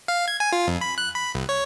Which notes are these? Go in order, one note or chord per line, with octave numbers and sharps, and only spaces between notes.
F5
G#6
G#5
F4
F2
B5
F#6
B5
C2
C#5